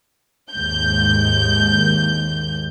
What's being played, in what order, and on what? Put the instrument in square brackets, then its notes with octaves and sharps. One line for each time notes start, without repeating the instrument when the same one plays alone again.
[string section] D#2 G#2 G6